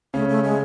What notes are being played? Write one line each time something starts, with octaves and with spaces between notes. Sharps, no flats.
C#3 A3 C#4
A3
G#3